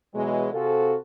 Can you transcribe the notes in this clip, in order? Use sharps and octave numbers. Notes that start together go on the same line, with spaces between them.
B2 E3 F#3 G#3
C3 C4 F4 F#4 G#4 A4